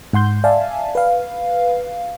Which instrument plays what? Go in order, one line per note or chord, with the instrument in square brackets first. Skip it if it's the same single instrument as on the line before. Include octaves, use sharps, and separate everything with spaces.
[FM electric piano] G#2 F#5 C6 G6
D5 E5 F5 G#5 A5
B4 F5